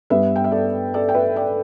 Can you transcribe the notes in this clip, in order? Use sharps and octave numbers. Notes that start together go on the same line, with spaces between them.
G2 G3 B3 B4 E5
G5
E5
A4 D5
A4 D5
G5
B4 E5
D5 G5